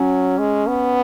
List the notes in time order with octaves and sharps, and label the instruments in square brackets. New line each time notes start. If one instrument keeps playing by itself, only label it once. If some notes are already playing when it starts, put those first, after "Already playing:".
Already playing: [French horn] F#3 [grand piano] C#4
[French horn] G#3
B3